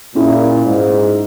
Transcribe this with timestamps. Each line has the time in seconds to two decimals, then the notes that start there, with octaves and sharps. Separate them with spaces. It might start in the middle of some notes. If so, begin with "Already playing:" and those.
0.15 A#2 C#4 E4 G#4
0.65 G#2